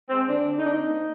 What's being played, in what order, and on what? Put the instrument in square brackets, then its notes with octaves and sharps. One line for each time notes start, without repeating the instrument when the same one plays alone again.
[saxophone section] G#3 C4
D3 D4
D3
D#4
C4 D4
D#4
A#3